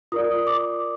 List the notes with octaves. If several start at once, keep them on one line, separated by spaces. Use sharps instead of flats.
F4 A#4 D5 D#6
D6